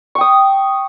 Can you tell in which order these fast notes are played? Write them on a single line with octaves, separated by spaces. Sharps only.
C#6 G5 D#6